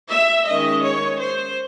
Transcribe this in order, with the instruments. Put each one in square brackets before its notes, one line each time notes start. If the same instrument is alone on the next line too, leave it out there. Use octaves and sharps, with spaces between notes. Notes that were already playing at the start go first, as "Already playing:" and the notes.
[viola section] E5
D#3 G#3 C#4 D#5
C#5
C5